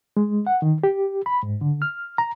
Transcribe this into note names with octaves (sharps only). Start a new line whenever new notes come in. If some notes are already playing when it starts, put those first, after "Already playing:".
G#3
F#5
D#3
G4
B5
G#2
D3
F6
A#5